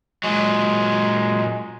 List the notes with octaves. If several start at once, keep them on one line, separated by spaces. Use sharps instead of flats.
A#2 F#3 G#3